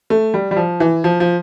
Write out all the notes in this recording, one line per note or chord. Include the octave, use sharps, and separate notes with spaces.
A3
G3
G3
F3
E3
F3
F3